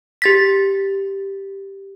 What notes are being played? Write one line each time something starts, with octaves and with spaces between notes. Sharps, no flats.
G4 A6 B6